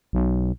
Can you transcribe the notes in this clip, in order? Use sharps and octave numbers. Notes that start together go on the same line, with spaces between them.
B1